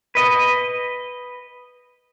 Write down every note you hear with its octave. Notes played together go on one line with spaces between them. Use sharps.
B4 D#5